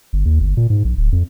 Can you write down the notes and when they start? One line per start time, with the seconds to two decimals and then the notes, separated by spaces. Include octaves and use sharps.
0.13 G1
0.25 D#2
0.40 G1
0.57 A#2
0.70 G#2
0.85 A#1
0.97 D1
1.12 F2